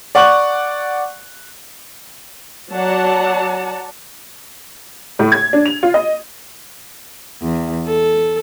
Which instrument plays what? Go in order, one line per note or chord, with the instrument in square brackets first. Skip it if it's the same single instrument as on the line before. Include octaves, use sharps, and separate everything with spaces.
[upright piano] D5 F#5 C#6 F#6 F#7
[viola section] F#3 D5 F#5 A5 A#5
[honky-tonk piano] A2
G#6
D4
F7
F4
D#5
[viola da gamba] E2
A4